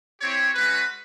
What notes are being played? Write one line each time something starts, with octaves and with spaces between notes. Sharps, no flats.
C4 E4 G4 C#5
G#3 C#4 F#4 B4